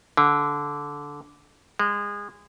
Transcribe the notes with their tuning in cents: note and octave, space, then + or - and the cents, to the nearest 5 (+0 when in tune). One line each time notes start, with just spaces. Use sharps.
D3 -15
G#3 -25